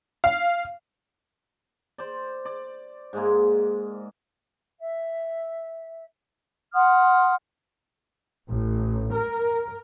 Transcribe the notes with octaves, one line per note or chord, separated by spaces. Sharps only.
F5
C5 D5
D5
G#2 G#3 A#3
E5
F#5 C6 D#6 F6
A1
A#4